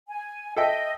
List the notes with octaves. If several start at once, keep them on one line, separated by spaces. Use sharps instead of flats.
G#5
A4 D#5 E5 G5